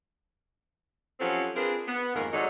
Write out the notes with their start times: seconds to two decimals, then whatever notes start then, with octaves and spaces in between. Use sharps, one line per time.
1.20 F3 F#3 C4 C#4 G4 A4
1.55 C4 D4 F4 G#4 A#4 B4
1.88 B3
2.15 F2 G#2 D#3 A#3 A#4
2.33 G#2 F#3 D#4 F#4 A4 D5